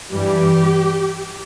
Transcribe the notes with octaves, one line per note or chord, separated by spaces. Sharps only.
G2 E3 G3 G4